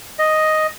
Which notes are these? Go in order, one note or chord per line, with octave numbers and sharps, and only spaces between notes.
D#5